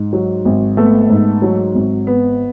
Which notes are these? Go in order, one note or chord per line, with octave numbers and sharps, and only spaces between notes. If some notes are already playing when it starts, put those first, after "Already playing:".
Already playing: G#2
F#3
G#1
A3 B3 A4
G#2
F#3
G#1
B3